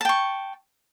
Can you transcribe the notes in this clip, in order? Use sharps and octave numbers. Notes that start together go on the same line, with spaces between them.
G5 A5 C#6